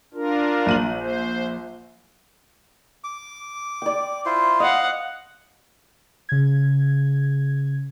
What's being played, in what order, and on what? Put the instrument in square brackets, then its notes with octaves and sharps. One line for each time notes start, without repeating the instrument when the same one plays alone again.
[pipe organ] D4 F4 A#4
[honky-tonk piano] A#1 D#7 F#7
[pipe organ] C5
[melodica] D6
[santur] D5 G5
[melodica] E4 F4 C5
[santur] D#5 [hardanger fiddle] F5 F#5
[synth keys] C#3 G#6